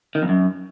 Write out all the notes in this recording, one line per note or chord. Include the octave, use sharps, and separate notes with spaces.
D#3
F2
F#2